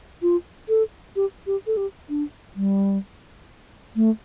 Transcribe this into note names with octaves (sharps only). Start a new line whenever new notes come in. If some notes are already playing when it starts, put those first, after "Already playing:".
F4
A4
G4
G4
A4
G4
D4
G3
A3